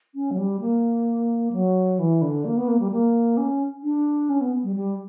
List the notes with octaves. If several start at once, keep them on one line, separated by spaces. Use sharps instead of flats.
C#4
F#3
G3
A#3
F#3
E3
D3
A#3
B3
A#3
G3
A#3
C#4
D4
C#4
B3
G3
G3